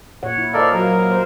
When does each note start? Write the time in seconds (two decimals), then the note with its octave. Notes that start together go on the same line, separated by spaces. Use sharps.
0.23 A#2 C#5 F#5
0.38 E4
0.53 A4 A#4 C5 D5 D#5 F5
0.73 F#3 A#3 A#4
1.11 C5